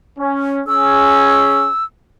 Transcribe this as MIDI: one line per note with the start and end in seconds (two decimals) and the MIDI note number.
0.19 0.61 61
0.67 1.69 61
0.67 1.69 68
0.67 1.84 88